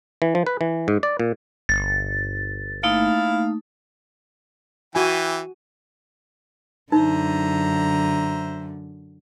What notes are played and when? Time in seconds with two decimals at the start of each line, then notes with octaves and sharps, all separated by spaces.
0.22 E3
0.35 F3
0.47 B4
0.61 E3
0.88 G#2
1.03 D5
1.20 A#2
1.69 G1 A6
2.83 A3 A#3 D#4 E4 F5
4.95 E3 F#4 G5 G#5
6.92 F#2 D3 D#4 C5 E5 A#5